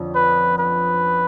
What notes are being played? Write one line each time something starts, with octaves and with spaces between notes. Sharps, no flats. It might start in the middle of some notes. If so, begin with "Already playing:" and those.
Already playing: F2 D3 C#4
B4
B4